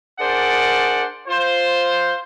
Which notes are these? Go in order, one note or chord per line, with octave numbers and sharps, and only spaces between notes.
D4 G#4 A#4 C5 D5 F#5
F4 C5